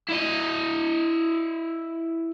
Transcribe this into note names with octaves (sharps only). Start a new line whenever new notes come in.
E4 D#5